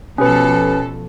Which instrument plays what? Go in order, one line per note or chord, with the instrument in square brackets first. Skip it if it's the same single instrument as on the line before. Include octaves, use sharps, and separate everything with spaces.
[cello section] B2 F3 A4 [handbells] C#4 G4 B4